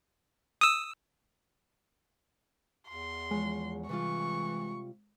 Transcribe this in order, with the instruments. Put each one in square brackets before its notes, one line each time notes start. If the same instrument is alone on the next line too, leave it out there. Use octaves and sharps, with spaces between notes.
[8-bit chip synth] D#6 E6
[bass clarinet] E2 [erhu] C6
[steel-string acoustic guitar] E3 F3 C#5 [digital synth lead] G#3
[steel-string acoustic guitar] C3 G3 F4 [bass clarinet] E3 [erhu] C#6